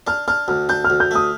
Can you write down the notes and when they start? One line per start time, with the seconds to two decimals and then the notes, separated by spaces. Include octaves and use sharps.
0.07 D4 F6
0.28 D4 F6
0.48 D2 F6
0.69 D4 G6
0.84 F6
0.90 D2
1.00 G6
1.11 A3 D#6